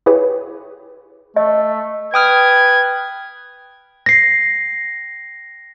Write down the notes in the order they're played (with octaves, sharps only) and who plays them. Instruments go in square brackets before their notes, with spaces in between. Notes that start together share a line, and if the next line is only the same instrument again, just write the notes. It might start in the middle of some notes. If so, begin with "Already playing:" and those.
[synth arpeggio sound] E4 G4 G#4 B4 C#5
[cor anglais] A3 [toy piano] D#5
[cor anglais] B4 [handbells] G5 D#6 F6 [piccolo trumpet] G#6
[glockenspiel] A#6 C7